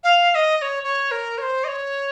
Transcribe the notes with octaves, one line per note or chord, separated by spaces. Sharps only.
F5
F5
D#5
D#5
C#5
C#5
A#4
C#5
C5
D#5
C#5